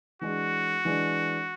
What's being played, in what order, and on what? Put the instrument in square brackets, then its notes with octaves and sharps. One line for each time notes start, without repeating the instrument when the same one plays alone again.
[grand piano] E3 G#3 D4 G#4 [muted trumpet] F#4
[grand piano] E3 G#3 D4 G#4